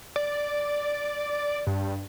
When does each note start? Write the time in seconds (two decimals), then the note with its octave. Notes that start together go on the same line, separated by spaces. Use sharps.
0.16 D5
1.67 G2